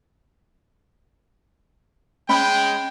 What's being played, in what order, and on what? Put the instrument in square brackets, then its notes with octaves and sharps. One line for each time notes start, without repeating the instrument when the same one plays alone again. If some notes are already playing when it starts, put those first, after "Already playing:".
[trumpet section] G#3 G5 [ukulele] C#4 B5